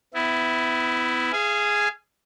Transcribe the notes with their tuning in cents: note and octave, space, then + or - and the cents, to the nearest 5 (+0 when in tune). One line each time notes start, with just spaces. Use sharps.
B3 +35 E4 +0
G#4 +0 F5 -30 G#5 +0